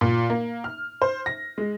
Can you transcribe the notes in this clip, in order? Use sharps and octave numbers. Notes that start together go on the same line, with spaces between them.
A#2
A#3
F6
C5
A#6
G#3